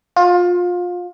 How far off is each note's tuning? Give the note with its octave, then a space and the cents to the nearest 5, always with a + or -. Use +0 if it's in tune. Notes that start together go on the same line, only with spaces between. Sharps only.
F4 +25